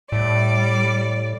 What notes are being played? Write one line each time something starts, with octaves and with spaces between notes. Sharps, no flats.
A2 G3 D5